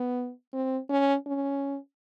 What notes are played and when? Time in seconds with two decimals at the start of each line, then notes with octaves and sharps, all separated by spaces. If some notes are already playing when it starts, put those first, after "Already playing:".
Already playing: B3
0.53 C4
0.90 C#4
1.26 C#4